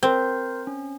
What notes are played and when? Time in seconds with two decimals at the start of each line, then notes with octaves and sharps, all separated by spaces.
0.03 C4 A#4 C6 G6
0.67 C#4